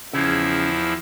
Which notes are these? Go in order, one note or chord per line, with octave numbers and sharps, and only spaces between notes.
E2 C#3 F3 E4